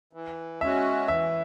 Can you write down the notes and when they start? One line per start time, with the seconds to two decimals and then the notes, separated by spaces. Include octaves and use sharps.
0.13 E3
0.61 G#3 C#4 F#4 E5
1.08 E3 E5